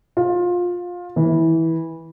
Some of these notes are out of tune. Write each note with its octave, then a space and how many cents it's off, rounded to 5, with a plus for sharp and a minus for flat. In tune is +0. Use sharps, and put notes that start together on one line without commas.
F4 +20
E3 -20